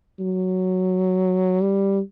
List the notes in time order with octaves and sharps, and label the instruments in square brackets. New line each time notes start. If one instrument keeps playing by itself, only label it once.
[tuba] F#3
G3